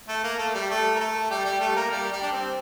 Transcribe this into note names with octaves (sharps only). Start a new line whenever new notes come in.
A3 A4
A#3 A#4
A3 A4
G3 G4
A3 A4
A#4
A3 A4
G3 G4
G3 G4
A3 A4
A#3 A#4
G3 G4
G3 G4
D4
C4